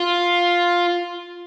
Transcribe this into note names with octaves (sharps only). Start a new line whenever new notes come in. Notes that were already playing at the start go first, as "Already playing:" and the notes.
Already playing: F4